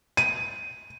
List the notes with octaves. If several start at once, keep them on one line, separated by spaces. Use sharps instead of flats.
D#7